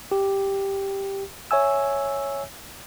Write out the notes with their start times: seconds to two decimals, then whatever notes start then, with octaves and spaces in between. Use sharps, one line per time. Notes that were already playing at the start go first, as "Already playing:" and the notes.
0.12 G4
1.51 C#5 E5 G#5 E6